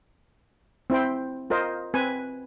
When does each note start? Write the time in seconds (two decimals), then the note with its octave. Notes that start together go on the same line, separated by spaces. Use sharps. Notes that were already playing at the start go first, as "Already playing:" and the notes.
0.90 C4 E4 C5 G5
1.50 F4 A#4 C5 D#5
1.94 C4 B4 G#5